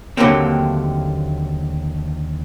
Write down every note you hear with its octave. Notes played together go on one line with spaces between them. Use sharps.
D#2 D3 F#3 A3 A#3 C4